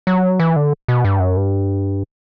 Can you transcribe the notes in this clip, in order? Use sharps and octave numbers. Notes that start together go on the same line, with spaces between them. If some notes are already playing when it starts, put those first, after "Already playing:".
F#3
E3
D3
B2
G2
F#2
G2